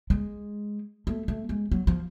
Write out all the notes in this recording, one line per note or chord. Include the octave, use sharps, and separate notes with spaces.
G#3
A3
A3
G#3
F#3
F3